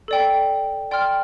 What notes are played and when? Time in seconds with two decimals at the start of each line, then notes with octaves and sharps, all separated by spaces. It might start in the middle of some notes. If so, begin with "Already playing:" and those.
0.08 A4 D5 G5
0.91 D5 G5 C6 F6